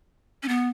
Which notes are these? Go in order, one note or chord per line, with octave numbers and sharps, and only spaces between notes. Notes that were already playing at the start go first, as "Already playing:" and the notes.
C#4
B3